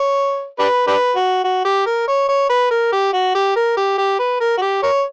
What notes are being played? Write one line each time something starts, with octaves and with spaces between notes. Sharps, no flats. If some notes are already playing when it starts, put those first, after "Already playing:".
Already playing: C#5
D4 G4 B4
D4 G4 B4
F#4
F#4
G4
A#4
C#5
C#5
B4
A#4
G4
F#4
G4
A#4
G4
G4
B4
A#4
F#4
G4
A#4 C#5